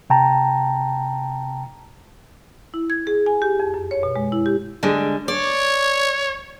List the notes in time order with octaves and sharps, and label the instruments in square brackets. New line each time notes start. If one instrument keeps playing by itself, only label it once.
[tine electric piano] C3 G5 A5 A#5
[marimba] E4
G#6
G#4
G#5
G4
F2
F#2
C#5
B2
G#3
E4
G4
[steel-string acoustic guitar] D3 G3 G#3
[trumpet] C#5 [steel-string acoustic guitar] D5